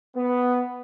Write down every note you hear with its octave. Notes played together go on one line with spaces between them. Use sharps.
B3